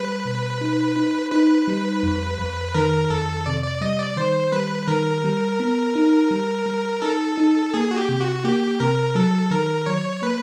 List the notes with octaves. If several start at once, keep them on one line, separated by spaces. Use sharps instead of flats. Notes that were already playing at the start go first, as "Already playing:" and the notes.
Already playing: G3 B4
B2
D#4
D#4
D#4 B4
G3
F2
F2
D#3 A#4
F2 A4
C3 D5
D5
G3 D#5
D5
D#3 C5
G3 B4
D#3 A#4
G3
B3
D#4
G3
G3
D#4 A4
D#4
A#3 G#4
F#4
G4
C3
F#4
A#3 G4
C3 A#4
F#3 A4
D#3 A#4
F#3 C#5
A#3 B4